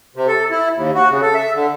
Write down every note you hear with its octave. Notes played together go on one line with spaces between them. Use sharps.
C3
A4
E4
D#2
F#4
C#3
A4
E5
D3